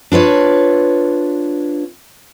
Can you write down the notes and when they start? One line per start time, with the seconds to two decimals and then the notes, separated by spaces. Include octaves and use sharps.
0.12 D4 F4 B4 C#5